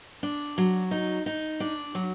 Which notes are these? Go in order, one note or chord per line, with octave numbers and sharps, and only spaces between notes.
D4
F#3
D#4
D#4
D4
F#3